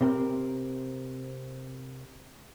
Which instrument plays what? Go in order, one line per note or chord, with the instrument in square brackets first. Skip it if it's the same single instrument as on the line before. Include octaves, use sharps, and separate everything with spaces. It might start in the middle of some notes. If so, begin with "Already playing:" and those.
[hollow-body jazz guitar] C3 C4 A#4